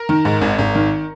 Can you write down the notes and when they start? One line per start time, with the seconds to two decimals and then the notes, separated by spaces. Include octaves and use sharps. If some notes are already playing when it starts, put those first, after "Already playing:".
Already playing: A#4
0.09 D#3
0.25 G#2
0.41 G#1
0.58 G#1
0.75 D#3